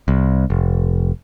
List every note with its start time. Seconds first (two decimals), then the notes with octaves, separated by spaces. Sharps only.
0.08 C2
0.50 F1